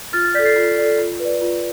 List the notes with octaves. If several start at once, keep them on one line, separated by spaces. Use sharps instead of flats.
F4 F6 A6
F6 A6
A4 D5 G6 B6
A6 C7
F4
A4 D5
F4
B4
D5
F4